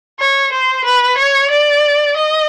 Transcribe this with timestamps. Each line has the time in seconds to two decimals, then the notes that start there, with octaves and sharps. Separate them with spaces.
0.20 C#5
0.52 C5
0.85 B4
1.18 C#5
1.51 D5
2.17 D#5